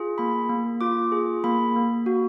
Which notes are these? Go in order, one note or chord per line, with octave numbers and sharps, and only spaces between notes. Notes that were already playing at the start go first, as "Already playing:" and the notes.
Already playing: F4 G#4
A#3 B5
A#3
F4 D6
G#4
A#3 B5
A#3
F#4